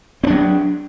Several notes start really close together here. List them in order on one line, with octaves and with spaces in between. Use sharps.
C4 D4 F#3